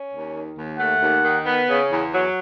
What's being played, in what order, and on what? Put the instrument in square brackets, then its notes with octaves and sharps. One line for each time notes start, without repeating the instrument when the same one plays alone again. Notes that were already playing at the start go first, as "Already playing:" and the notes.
Already playing: [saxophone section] C#4
D#2
D#3
D#2
[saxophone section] A3 [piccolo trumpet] F#5
[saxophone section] D#2
D#3
B3
C#3
E2
F#3